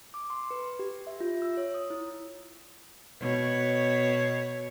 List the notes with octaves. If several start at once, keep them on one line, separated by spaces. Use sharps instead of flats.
D6
C6
B4
G4
E5
F4
E6
C#5
D#6
E4
B2 C#5